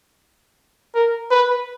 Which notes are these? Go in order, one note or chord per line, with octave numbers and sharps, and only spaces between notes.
A#4
B4